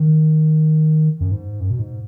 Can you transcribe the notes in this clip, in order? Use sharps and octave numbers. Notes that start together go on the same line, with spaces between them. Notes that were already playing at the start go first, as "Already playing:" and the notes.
Already playing: D#3
F#2
G#2
F#2
B2
G#2